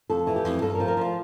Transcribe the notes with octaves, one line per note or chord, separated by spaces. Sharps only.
F2 A4
E3
G4
F2
G2 A4
A#4
F3
A#4
F3 F4